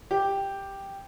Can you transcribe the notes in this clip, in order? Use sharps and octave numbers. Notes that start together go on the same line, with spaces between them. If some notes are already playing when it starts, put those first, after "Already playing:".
G4